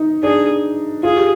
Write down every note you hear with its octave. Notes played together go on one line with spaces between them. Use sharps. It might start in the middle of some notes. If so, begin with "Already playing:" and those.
Already playing: D#4
D4 G#4
F4 G#4
G4